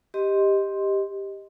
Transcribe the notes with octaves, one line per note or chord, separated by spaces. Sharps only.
G4 D#5 C6